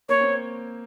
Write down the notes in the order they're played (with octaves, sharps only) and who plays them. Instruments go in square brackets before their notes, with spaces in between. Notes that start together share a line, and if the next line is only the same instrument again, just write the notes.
[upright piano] A#3 [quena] C#5
[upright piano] C4